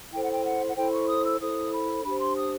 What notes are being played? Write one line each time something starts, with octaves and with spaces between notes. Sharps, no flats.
E4 A4 C5 G5
F#5
G5
F#5
F#5
E4 A4 C5 G5
C#6
D#6
E6
E4 A4 C5 D#6
B5
D4 G4 C5 B5
C6
D#6